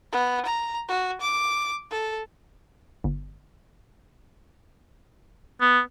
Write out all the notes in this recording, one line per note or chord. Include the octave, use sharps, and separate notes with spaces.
B3
A#5
F#4
D6
A4
G1
B3